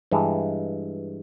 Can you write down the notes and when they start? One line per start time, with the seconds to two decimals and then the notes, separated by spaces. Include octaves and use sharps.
0.11 G2 E3 G#3